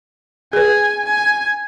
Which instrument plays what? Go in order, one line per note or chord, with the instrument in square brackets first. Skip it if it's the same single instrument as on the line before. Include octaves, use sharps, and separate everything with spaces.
[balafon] G#4 B4 [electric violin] G#5
[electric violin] G#5